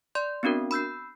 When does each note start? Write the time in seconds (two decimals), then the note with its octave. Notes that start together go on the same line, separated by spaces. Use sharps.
0.15 D5 C6 G6
0.43 B3 C4 D4 F#4 A#4
0.71 B5 E6 G6 C7